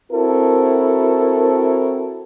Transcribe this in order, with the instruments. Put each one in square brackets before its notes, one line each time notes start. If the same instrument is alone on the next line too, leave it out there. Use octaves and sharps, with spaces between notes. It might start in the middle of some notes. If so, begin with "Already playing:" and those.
[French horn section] C4 E4 F#4 A4 A#4